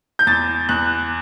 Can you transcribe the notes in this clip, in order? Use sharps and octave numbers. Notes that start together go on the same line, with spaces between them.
G6
E2 A6
E2 F#6